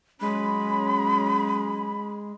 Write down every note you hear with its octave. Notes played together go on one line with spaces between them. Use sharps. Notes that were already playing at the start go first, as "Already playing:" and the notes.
F#3 G#3 C#4 B5